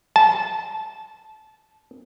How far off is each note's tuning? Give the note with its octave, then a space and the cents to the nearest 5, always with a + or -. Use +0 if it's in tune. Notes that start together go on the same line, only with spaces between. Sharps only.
A5 -20